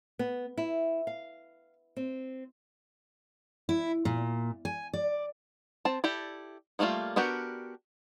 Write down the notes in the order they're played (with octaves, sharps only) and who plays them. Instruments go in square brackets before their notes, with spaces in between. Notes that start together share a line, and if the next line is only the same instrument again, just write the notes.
[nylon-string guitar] B3
E4
F5
C4
[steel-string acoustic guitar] E4
A#2
G#5
D5
[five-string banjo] C4 A5
E4 G4 A4 D5
D#3 G3 A3 A#3 F4
B3 D4 F#4 G4 A#4